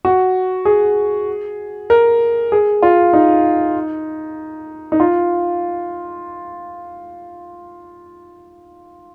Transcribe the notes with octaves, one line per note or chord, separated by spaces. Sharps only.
F#4
G#4
A#4
G#4
F4
D#4
D#4
F4